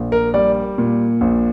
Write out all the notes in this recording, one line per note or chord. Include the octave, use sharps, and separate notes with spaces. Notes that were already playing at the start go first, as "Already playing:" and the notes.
Already playing: A#1
A#4
G3 D5
A#2
A#1